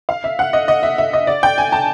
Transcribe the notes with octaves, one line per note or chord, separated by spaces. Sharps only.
F5
E5
F#5
D#5
D#5
E5
E5
D#5
D5
G5
G#5
A5